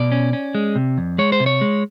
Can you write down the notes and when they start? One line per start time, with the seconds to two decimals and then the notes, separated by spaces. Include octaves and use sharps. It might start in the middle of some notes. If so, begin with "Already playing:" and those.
Already playing: B2 D5
0.12 C#4
0.33 C#4
0.55 G#3
0.76 C3
0.98 F2
1.18 G#3 C#5
1.32 C5
1.40 C3
1.46 C#5
1.61 G#3